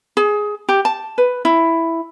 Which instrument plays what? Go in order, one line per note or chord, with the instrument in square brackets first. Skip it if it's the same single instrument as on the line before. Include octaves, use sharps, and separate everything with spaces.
[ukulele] G#4
G4
A5
B4
E4